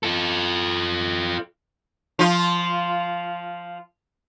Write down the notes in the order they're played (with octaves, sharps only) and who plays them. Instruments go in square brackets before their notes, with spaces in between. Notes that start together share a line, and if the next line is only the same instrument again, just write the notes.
[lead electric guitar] F4 A4
[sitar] F3 F4